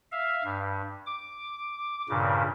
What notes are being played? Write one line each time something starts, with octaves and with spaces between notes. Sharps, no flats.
E5 F5
G2
D6
G2 A#2 C#3